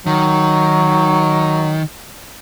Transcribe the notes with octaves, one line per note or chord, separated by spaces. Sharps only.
D#3 F#3